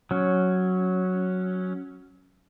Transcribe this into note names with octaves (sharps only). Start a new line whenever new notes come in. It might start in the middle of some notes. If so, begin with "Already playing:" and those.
F#3 C#4